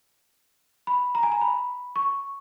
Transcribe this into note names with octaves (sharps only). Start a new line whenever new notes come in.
B5
A#5
G#5
A#5
B5
C#6